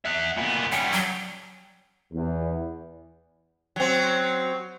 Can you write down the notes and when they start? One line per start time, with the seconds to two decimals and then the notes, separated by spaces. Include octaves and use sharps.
0.05 E5 F#5
0.37 A#2 B3
0.72 G3 C#4 F#5
0.92 F#3
2.13 E2
3.76 F#3 C4